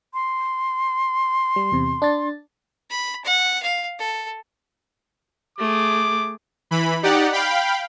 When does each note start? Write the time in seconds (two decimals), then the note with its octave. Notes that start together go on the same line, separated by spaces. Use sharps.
0.14 C6
1.56 G3
1.72 E2 C3
2.02 D4 D5 A6
2.90 B5
3.25 F#5
3.62 F5
3.99 A4
5.58 A3 G#4 D6
6.71 E3 B5
7.03 D#4 G4 D5 F#5
7.32 F5 G5 B5